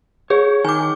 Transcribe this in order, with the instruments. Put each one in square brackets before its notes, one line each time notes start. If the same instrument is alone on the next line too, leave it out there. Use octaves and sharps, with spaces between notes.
[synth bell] G#4 [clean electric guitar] C#5
[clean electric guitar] D#3 [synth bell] G#5 D6